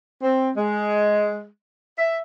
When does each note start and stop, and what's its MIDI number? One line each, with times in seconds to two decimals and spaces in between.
0.23 0.52 60
0.57 1.46 56
1.99 2.19 76